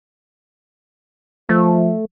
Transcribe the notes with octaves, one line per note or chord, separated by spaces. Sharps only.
F3 A3